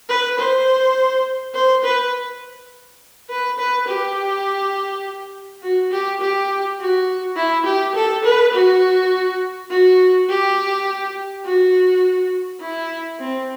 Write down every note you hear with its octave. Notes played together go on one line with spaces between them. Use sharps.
B4
C5
C5
B4
B4
B4
G4
F#4
G4
G4
F#4
E4
G4
A4
B4
F#4
F#4
G4
F#4
E4
C4